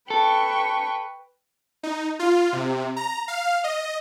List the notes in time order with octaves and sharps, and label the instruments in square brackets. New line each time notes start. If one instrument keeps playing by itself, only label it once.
[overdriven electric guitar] A4 [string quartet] B4 G5 C#6
[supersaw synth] D#4
F4
C3
A#5
F5
D#5